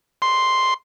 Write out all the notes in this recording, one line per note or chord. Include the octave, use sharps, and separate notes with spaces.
C6